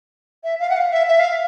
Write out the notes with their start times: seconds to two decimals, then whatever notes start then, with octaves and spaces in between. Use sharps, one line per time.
0.44 E5
0.60 F5
0.70 F#5
0.77 F5
0.92 E5
1.09 E5
1.20 F5